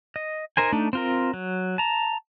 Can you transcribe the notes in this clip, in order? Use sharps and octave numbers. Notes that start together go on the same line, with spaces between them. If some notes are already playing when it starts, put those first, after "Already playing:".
D#5
D#4 A#4 C5 G#5
A3 D4 D#4
C4 F4 A#4
F#3
A5 A#5